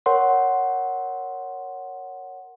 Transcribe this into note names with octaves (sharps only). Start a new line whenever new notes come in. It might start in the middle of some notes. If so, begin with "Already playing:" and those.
A#4 C#5 F#5 C6